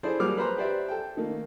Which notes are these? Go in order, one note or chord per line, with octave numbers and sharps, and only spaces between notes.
E4 G#4 A4 C5 D5
F#3 G3 A#3 G#4 D6 F6
B4 C5 A#5 C6
G4 B4 C5 D5 E5
A4 G5
D#3 A3 A#3